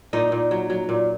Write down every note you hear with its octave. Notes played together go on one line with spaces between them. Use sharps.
A#2 D#4 D#5
A#2
F#3
F#3
A#2